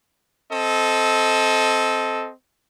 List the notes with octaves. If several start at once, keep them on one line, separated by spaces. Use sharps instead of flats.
C4 A4 D#5